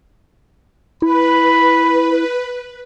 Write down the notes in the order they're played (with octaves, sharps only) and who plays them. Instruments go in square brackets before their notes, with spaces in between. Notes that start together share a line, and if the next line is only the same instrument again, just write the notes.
[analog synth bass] E4 [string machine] B4 [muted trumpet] B5